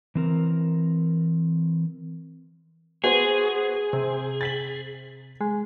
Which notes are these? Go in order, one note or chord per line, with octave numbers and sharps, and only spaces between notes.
E3 C4 A#4
B3 F#4 G#4 C5
C3 C4
A6 B6 F#7
G#3